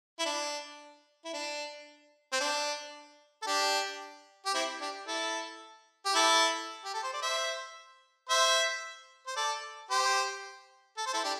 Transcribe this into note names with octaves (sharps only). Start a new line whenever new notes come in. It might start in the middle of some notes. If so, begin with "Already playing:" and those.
E4
D4
E4
D4
C4
D4
A4
D4 G4
G4
C4 E4
D4 G4
E4 A4
G4
E4 A4
G4
A4
C5
D5
C5 E5
C5 E5
C5
A4 D5
G4 C5
A4
C5
E4 A4
D4 G4